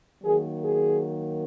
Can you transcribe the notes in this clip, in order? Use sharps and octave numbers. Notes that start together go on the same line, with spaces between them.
D#3 F#3 A#3 G#4
G#4